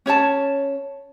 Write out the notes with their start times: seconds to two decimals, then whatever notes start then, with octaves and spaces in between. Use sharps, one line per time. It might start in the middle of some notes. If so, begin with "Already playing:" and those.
0.06 C#4 C#5 D5 A5